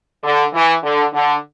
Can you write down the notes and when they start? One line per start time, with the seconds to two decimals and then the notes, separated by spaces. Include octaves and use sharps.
0.24 D3
0.54 E3
0.83 D3
1.13 D3